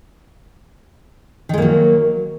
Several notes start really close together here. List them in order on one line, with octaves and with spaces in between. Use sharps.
D#3 G#3 A#3 F#3